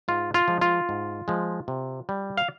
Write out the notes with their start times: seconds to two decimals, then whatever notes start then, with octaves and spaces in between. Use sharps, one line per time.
0.08 G#2 F4
0.34 F4
0.48 F3 G#3
0.61 F4
0.89 G#2
1.28 F3 G#3
1.68 C3
2.09 G3
2.38 F5